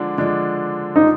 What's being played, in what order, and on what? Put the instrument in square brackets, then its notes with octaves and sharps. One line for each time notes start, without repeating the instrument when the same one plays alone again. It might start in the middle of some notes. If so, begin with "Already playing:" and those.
Already playing: [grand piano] D3 F3 G#3 D4
D3 F3 G#3 D4
[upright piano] D#4